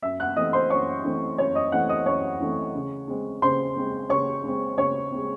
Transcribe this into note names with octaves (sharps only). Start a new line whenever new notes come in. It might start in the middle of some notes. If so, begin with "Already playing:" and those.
F#2 E5 E6
F#5 F#6
E3 A3 C4 D#5 D#6
C5 C6
F#2 C#5 C#6
E3 A3 C4
F#2 C#5 C#6
D#5 D#6
E3 A3 C4 F#5 F#6
D#5 D#6
F#2 C#5 C#6
E3 A3 C4
C#3
G#3 C4
C#3 C5 C6
G#3 C4
C#3 C#5 C#6
G#3 C4
C#3 C#5 C#6
G#3 C4